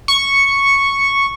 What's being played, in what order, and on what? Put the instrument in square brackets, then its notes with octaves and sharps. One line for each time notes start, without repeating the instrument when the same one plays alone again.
[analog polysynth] C#6